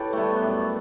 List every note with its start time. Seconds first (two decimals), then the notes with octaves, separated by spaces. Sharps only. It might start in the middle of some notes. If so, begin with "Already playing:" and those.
Already playing: E3 G4 A4 B4 C#5
0.13 G3 A3 B3
0.30 B3
0.42 F#2